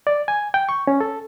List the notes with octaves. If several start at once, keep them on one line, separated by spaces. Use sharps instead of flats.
D5
G#5
G5
C#6
C#4
A4